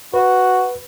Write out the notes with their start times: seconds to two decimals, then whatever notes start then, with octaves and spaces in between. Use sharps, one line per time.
0.14 F#4 B4